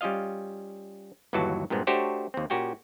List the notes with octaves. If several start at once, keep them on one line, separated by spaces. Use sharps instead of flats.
G3 C#4 F4 D#5 F5
G1 D#2 E3 F#3 F#4 A5
G2 A#2 G#3 B3 C4
A3 D4 F#4 G4 C5 C#5
D#2 C4
A#2 C#4 F#4 G4 G5